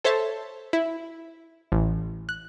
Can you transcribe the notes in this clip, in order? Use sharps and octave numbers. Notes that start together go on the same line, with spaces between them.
A4 C5 C#5 E5 A5
E4
A1
F#6